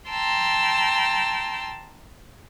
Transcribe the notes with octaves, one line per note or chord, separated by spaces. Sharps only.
G5 A5 A#5 C6 E6